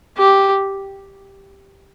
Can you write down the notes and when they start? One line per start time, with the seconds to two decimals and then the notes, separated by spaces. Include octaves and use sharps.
0.18 G4